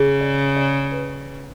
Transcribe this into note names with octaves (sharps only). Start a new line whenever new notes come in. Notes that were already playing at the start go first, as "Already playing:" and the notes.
Already playing: C#3 G#4
D5
D5
B4